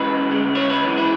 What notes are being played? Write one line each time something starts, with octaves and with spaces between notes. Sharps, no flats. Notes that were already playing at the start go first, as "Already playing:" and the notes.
Already playing: F#2 C#3 E3 G#3 B4
D2 C#3 G#3
C#5
B4
F#2 E3 G#3
E4